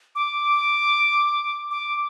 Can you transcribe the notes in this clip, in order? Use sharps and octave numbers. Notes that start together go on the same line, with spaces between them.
D6
D6